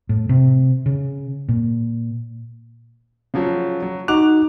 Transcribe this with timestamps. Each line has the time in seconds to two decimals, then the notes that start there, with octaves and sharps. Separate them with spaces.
0.09 A2
0.29 C3
0.86 C#3
1.49 A#2
3.34 C#3 F3 F#3
3.82 F#3
4.08 D#4 F#4 D6 F#6 F7